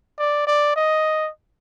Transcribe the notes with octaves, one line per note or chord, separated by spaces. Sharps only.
D5
D5
D#5